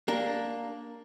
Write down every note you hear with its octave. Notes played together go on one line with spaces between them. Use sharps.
A#3 D4 A#4